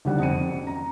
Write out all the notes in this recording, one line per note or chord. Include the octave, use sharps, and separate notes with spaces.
D2 D#3 G3 D5 F#5
F2 C4 C#7 D#7
F#2
A#5